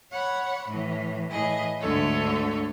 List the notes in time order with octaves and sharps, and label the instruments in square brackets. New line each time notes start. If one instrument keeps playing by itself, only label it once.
[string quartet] C#5 F#5 B5
A2 E3
A2 E3 E4 G#4 D#5
D2 G#2 D3 A3 A4 C#5